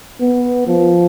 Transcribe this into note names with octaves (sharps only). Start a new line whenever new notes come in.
B3
F3